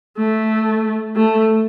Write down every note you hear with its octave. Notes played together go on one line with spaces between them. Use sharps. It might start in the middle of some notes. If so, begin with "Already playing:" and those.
A3
A3